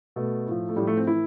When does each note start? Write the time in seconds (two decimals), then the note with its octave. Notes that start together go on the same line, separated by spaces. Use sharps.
0.16 B2 A3
0.47 A2 F3
0.69 A3
0.76 A2 F3 G3
0.87 A3
0.97 C4
1.06 A2 E3 E4